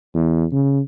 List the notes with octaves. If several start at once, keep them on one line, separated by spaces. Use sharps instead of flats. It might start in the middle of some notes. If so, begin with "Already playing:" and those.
E2
C#3